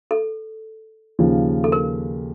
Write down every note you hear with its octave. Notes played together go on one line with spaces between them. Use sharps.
A4
D#2 C#3 F3
A4
A#4